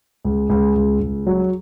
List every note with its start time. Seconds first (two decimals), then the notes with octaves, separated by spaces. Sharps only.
0.25 C#2
0.50 C#2
0.75 C#2
1.00 C#2
1.27 F#3